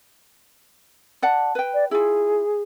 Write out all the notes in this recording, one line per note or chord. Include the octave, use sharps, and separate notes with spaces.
D5 F#5 A5
B4 G5
D5
E4 F4 G#4